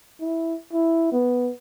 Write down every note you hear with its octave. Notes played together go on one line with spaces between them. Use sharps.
E4
E4
B3